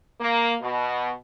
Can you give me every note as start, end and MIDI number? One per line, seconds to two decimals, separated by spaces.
0.21 0.54 58
0.61 1.12 47